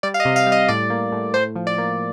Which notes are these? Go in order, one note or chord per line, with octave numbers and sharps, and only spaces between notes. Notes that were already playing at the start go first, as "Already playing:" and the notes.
G3 D5
F5
D#5
C3
F5
G3
D#5
A2 D5
A#3
A2
A2 C5
F3
D5
A#3